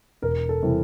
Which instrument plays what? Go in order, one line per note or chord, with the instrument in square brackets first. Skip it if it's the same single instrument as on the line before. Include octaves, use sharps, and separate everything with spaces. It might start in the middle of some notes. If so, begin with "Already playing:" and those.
[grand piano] E1 A#4
A4
C3 E3 G3